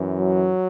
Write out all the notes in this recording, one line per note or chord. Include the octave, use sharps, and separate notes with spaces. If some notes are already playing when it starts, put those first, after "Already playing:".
Already playing: F#2 E3
F#3